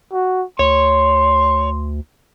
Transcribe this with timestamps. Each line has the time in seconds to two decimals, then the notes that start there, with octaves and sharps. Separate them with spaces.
0.12 F#4
0.59 D2 C#5 C6